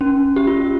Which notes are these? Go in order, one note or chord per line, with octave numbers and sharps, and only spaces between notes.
C#4
G4
F4